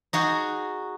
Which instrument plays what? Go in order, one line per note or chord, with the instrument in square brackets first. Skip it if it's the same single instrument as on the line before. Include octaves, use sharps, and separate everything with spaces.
[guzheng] D#4 F#4 G#4